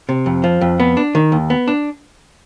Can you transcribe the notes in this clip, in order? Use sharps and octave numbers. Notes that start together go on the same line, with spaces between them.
C3
F2
F3
F2
B3
D4
D#3
D#2
B3
D4